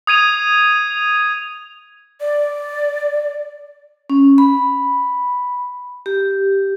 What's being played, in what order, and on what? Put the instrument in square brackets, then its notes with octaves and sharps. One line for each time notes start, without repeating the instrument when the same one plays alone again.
[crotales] D#6 G#6 D#7 F7
[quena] D5
[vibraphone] C#4
B5
G4